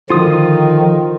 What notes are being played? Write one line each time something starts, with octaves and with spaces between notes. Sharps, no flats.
D3 D#3 F3 F4 D#6